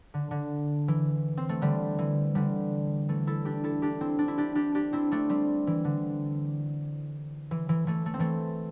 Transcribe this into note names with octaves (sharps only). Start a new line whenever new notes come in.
D3
D3
E3
C4
A3
D3 G3
E3
D3 G3
E3 A3
E4 A4
D4 G4
E4 A4
D4 G4
C4 E4
D4
E4
D4 G4
D4 G4
D4 G4
C4 E4
A3 D4
G3 C4
E3
D3
E3
E3
E3 A3
A3
C4
E3 A3